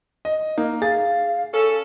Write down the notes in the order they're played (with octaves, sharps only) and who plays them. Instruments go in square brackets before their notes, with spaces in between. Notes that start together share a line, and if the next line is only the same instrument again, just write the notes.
[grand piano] D#5
[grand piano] A#3 [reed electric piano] D#4
[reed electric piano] G#4 [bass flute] F5 [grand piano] A6
[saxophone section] C#4 A4